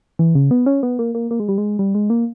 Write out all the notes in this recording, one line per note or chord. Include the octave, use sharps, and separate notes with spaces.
E3
C#3
B3
C#4
B3
A#3
A#3
A#3
G#3
G3
G#3
G3
G#3
A#3